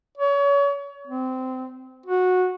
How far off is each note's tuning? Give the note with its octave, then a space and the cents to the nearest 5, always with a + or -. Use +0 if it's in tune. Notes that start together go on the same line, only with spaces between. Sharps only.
C#5 +30
C4 -20
F#4 -15